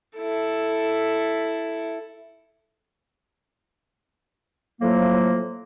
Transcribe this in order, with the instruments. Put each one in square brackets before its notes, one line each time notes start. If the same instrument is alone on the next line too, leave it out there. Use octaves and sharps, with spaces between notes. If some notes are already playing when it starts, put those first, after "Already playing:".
[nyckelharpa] E4 A4
[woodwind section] A2 F3 F#3 A#3